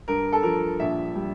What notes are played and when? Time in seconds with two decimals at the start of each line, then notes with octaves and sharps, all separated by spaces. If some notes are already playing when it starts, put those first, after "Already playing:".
0.08 G2 A#4
0.33 A4
0.43 F3 A#4
0.80 A#1 E5
1.15 G3